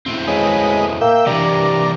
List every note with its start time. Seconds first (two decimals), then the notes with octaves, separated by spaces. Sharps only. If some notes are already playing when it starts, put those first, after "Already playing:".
0.06 A2 C4
0.27 C#3 G#3 B4 D#5
1.01 A#3 E5 G5
1.26 C3 E3 G3 D4 A#4